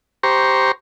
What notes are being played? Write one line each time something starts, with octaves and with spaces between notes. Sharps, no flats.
G4 C5 A#5 C#6